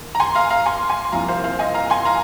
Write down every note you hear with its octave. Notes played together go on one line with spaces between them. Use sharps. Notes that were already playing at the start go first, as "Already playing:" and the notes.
Already playing: D#2
A#5
G#5 C6
F5 A#5
F5 A#5
G#5 C6
G#5 C6
C6
C2 A#2 F3 F5 A#5
C5 F5
C5 F5
D#5 G#5
F5 A#5
G#5 C6
F5 A#5